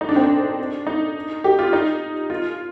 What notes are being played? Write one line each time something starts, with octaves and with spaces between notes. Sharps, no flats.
D#4
D4
C4
D4
D#4
G4
F4
D#4
F4